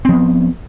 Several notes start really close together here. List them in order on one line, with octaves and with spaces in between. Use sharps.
C4 F3 B3